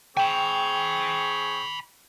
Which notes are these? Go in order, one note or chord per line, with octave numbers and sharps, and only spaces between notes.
C4 G#4 G5 G#5 B5 C#6